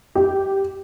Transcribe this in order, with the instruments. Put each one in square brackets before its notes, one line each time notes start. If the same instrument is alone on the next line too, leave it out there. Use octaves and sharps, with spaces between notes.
[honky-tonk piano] G4